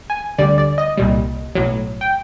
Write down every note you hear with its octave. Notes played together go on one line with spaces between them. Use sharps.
G#5
D2 D3 G3 D5
D5
D#5
C2 A#2 G3
B1 A2 F#3
G5